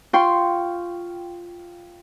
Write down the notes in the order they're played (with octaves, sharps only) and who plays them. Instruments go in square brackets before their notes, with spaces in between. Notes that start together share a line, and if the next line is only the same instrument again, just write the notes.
[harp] F4 G5 C6 C#6